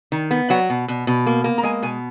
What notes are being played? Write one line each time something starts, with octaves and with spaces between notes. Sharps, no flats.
D#3
B3
F#3 F#5
B2
B2
B2
A#3
A#3
A#5
G#3 G#5
B2 G#5